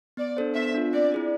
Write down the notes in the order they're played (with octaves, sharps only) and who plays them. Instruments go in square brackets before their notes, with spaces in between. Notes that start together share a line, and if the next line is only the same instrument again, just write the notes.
[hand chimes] B3 [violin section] D5
[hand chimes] D4 A4 C5
[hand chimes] B3 [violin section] E5
[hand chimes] D4 F4
[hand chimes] C4 [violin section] D5
[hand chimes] E4 G#4 D5